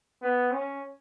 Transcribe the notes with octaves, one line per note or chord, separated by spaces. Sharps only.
B3
C#4